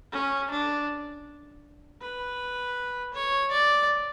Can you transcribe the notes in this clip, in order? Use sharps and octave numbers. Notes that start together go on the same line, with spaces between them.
C#4
D4
B4
C#5
D5